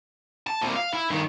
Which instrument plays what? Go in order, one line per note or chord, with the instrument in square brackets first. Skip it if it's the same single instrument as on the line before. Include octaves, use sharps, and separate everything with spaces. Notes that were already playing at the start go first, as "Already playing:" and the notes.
[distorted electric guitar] A5
C2 A#2
F5
E4
G2 D#3